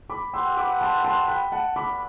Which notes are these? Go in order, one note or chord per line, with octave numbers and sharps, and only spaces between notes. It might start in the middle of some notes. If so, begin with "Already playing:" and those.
B5 D6
C4 G4 B4 F#5 C6 E6
B5 D6
A5 C6
A5 C6
G5 B5
F#5 A5
G3 B3 F#4 A4 B5 D6